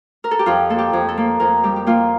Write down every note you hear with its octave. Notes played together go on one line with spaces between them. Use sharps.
A#4
A4
G4
F2 F4
A#3 A4
G4
F2
A4
A#3
F2 A#4
G3 G4
G4
A#3 F4